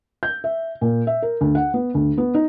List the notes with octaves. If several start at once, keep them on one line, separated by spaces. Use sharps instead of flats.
G6
E5
A#2
E5
A#4
D2
F#5
B3
D2
B3
D#4